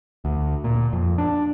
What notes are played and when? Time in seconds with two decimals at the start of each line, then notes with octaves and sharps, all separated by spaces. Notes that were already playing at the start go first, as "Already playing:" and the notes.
0.25 D2
0.64 A#2
0.93 F2
1.18 D4